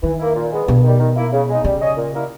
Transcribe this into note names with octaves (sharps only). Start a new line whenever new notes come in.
D#3 E3
A#3 E4
A#2
G#3 B3
G2 B2
D#3 G3
D#3
A#3 E4
C#3
G#3 D#4
C#3 G3
C#4 G#4 D#5
A#2
G3 A#3 E4 A#4